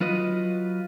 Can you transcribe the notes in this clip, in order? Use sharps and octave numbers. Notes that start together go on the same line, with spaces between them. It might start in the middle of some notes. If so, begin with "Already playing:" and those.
F#3 F4 B4 D#5